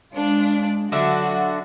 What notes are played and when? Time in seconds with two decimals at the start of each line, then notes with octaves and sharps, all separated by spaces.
0.14 G#3 D4 F4 D7
0.92 D3 F#3 D4 F#4 E5